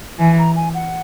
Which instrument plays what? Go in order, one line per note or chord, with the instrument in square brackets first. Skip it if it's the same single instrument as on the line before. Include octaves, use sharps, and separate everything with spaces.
[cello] E3 [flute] G#5
[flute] A#5
G#5
F#5